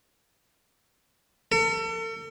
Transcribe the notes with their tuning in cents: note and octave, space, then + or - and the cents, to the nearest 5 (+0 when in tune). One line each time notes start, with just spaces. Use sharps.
A4 +40